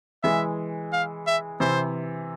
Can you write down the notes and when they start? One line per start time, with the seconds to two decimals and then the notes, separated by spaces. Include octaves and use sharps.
0.23 E3 G#3 E5
0.93 F5
1.27 E5
1.60 C3 E3 C5